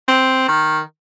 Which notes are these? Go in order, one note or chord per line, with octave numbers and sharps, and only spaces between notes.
C4
D#3